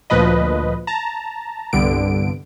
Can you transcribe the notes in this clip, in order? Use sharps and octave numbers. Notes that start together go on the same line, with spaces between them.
D2 A#2 F3 B4 D#5
A5 A#5
C2 G2 D3 B3 D7